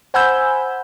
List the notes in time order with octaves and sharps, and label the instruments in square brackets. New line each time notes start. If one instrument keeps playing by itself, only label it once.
[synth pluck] C5 F#5 G#5 B5 E6 G6